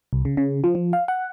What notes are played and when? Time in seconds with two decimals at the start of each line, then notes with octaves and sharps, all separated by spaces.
0.13 C2
0.25 C#3
0.37 C#3
0.64 F3
0.75 F3
0.93 F5
1.08 F#5